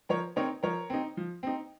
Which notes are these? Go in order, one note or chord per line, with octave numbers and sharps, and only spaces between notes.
F3 A#4 C#5
C4 D#4 A#4 C#5
F3 A#4 C#5
C4 D#4
F3
C4 D#4